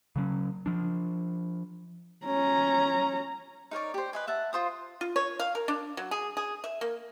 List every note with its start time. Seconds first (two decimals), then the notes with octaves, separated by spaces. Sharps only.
0.16 C#3 F#3 C#4
0.66 F3 D4
2.25 C#4 A#5
3.71 D#4 A#4 C#5 D5
3.94 G4 C5
4.13 B4 D#5 G#5
4.27 E5 F#5 A5
4.53 F4 C5 D#6
5.01 F4
5.16 C#5
5.39 F5
5.55 A#4
5.68 D4
5.97 F#3
6.11 G#4
6.37 G#4
6.64 E5
6.81 A#3